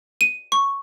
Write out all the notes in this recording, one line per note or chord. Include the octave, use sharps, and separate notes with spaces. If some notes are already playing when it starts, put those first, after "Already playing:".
D#7
C#6